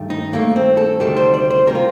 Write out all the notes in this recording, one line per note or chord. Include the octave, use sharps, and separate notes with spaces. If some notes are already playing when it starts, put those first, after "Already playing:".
Already playing: G2 D#3 A3
D#4
G2 D#3 A3 A#3
C4
A4
D2 C3 D#3 G3 A4
C5
D5
C5
C3 D#3 G3 A#4
F4